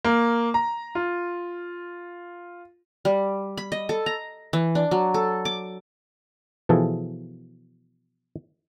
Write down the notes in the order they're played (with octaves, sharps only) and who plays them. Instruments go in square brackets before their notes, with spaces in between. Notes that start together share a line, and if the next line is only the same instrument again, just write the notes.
[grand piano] A#3
A#5
F4
[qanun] G3
B5
D#5
A4
A#5
E3
D4
F#3
A4
D6
[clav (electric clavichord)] B2 E3 F3 G#4 A4